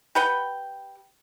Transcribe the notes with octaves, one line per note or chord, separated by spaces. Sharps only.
G4 B4 F#5 G5